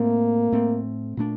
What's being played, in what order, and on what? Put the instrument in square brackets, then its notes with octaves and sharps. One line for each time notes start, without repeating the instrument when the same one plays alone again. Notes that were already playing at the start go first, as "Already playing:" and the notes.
Already playing: [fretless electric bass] A2 A3 C4 [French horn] A#3
[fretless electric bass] A2 A3 C4
A#2 A3 D4